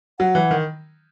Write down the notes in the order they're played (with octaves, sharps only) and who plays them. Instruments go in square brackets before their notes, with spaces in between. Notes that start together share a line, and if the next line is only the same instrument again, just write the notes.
[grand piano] F#3 [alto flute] F#5
[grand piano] E3
D#3